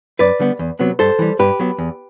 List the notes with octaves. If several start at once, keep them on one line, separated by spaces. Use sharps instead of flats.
F#2 B4 D5
D3 G3 B3
E2
C3 F#3 B3
G2 A4 C5
E3 G3
G2 G4 B4
F#3 B3
E2